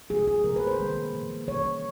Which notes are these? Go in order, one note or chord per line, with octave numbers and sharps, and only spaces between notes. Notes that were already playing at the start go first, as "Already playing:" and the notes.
C3 F3 G#3 G#4
G#4
C3 F3 A#3 A#4
B4
C5
D#3 G3 A#3
C3 F3 A#3
C3 E3 G3 A#3 C#5